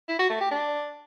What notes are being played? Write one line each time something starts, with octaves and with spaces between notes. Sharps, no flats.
E4
F#4
A3
G4
D4